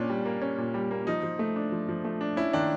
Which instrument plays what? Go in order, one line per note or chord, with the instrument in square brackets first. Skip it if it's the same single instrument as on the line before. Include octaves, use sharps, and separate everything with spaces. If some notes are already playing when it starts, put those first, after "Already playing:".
Already playing: [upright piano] A#2 C#4 [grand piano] D4
[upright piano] G3
A#3
C#4
A#2
G3
A#3
[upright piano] F3 [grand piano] D#4
[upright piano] F3
A3
D4
F3
F3
A3
D4
[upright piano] C#4 [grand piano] E4
[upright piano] D#3 [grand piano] D4